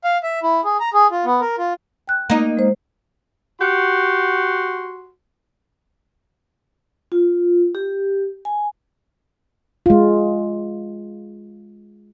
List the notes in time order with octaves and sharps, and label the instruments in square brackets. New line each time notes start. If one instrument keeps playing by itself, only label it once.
[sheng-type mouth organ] F5
E5
E4
G#4
A#5
G#4
F4
B3
A#4
F4
[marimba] G5 F#6
[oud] A#3 D#4
[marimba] G#3 C5
[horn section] F#4 G4 F#5 C6
[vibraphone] F4
G4
G#5
[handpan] G#3 F4